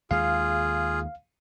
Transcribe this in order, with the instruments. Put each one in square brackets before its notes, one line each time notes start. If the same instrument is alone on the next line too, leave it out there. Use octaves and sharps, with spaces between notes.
[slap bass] D#2 G#3 [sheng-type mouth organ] F4 G#4 [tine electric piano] F5